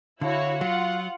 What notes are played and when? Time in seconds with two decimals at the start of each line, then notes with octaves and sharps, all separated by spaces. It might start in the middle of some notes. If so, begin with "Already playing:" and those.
0.21 D3 E4 F#4 C#5 F5
0.61 F#3 F4 F#5